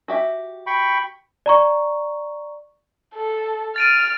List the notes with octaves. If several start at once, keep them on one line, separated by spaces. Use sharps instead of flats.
F#4 G4 E5
G5 B5 C#6
D5 A#5 C#6
A4
F6 A6 D7 D#7